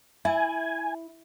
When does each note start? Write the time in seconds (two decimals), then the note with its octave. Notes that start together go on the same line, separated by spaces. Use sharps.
0.25 E4 E5 G#5